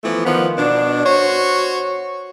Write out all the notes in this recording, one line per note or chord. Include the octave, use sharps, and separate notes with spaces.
E3 F3 A3 B3
D#3 F3 B3
B2 D4
F#4 C5 C#5